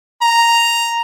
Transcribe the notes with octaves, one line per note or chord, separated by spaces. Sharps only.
A#5